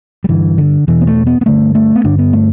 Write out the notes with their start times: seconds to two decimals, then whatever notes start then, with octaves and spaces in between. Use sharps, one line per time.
0.24 G3
0.29 G2 D3 E3
0.58 D3
0.87 E2 B2 E3
1.01 B3
1.07 A3
1.27 B3
1.41 B3
1.46 G2 D3 A3
1.75 A3
1.95 B3
2.04 G2 D3 D4
2.19 B3
2.33 A3